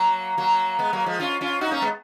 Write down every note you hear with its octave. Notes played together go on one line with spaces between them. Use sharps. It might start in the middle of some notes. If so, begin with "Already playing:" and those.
Already playing: F#3 A#3
F#3 A#3
G#3 B3
F#3 A#3
F3 G#3
C#4 F4
C#4 F4
D#4 F#4
A#3 C#4
G#3 B3